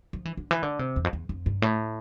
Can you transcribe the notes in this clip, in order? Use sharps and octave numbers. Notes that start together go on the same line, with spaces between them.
F3
E3
D3
E3
D3
C3
E2
F2
E2
F2
G2
A2